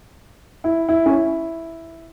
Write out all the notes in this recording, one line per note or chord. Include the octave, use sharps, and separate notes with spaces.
E4
E4
C#4
E4